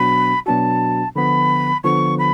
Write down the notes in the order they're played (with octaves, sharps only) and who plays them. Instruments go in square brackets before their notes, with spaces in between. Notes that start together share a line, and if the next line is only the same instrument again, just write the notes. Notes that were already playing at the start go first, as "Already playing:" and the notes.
Already playing: [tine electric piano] B2 F#3 B3 D4 F#4 [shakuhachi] B5
[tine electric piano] B2 F#3 B3 D4 F#4 [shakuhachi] A5
[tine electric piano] D3 F3 B3 [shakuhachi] B5
[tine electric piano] D3 F3 B3 [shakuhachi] C#6
[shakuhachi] B5